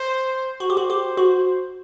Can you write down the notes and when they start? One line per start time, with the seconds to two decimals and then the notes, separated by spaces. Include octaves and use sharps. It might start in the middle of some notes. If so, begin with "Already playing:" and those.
Already playing: C5
0.60 F#4 C5
0.70 G4
0.77 F#4
0.90 G4
1.17 F#4